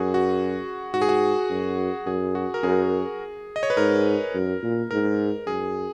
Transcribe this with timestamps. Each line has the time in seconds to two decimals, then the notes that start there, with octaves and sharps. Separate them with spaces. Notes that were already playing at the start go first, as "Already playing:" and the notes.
Already playing: F#2 F#4 G#4
0.14 F#4
0.94 G#2 F#4
1.02 G#4
1.09 F#4
1.50 F#2
2.06 F#2 G#4
2.35 F#4
2.54 A#4
2.63 F#2 G#4
3.56 D#5
3.63 C#5
3.70 B4
3.77 G#2 A#4
4.34 F#2
4.63 A#2
4.91 G#2 A#4
5.47 F#2 G#4